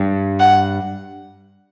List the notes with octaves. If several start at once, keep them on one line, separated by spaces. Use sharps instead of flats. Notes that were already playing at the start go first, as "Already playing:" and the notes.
Already playing: G2
F#5